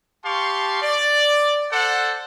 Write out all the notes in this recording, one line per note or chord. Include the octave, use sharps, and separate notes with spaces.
G4 F5 A5 C6 C#6
D5
A4 C5 D5 F#5